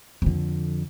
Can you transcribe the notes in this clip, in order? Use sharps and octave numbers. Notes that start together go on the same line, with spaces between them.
F2 D3